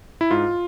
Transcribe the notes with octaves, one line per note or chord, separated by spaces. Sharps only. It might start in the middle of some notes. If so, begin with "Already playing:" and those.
E4
G#2 F4